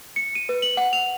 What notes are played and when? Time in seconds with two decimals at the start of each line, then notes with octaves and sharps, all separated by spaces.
0.16 C#7
0.35 D#7
0.49 B4
0.62 F#7
0.77 F#5
0.93 F7